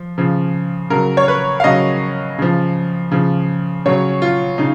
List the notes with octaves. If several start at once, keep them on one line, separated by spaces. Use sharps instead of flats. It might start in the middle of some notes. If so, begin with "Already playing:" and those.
Already playing: F3
C#3 F3
C#3 F#3 A#4
C#5
B4
F5
C#3 F#3 D#5
C#3 F3
C#3 F3
C#3 F#3 C#5
F4
C#3 D#4